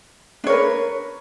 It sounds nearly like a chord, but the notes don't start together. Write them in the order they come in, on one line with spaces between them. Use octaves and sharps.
D4 C#5 A#4 B4